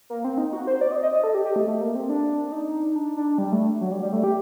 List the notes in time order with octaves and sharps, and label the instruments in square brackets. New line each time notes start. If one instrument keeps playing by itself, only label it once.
[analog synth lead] A#3
C4
D#4
F#4
C5
D5
D#5
D#5
D#5
A4
G4
G4
A3
A3
A#3
C4
D4
D#4
D4
D4
G3
A3
F#3
G3
G3
A3
G4